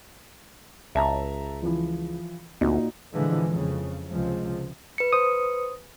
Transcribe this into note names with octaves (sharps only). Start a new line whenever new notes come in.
C#2 E5 A5 A#5
E3 F3
D2 A#2 D#4 F#4
A#2 D3 E3 F3 G#3
F2 C#3
C#2 C3 F3 G#3
B4 C#7
C5 D#6